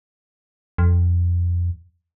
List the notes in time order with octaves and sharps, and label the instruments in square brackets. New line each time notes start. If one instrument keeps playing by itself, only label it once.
[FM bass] F2